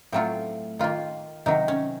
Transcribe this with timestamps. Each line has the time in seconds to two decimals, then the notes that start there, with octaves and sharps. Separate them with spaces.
0.12 A2 F#3 A3 C4 F4
0.79 D#3 A#3 F4
1.46 C3 D#3 F#3 D#4
1.68 C#4